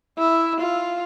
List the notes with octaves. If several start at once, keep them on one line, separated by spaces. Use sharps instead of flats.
E4
F4